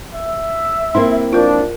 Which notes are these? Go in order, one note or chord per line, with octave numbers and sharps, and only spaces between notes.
E5
A#3 C4 E4 C6
F3 D4 F4 A#4